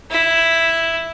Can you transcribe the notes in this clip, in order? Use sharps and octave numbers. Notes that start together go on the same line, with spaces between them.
E4